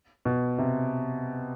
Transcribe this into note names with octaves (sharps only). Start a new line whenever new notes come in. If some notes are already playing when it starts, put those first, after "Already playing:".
B2
C3